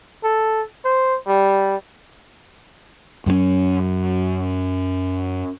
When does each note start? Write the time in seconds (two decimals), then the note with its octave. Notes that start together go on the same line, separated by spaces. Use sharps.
0.24 A4
0.85 C5
1.27 G3
3.26 F#2 F#3 G3 C#4